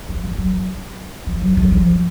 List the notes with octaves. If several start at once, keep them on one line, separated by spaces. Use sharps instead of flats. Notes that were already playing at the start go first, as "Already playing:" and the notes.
F3
F3
F#3
F3
F#3
F#3
F3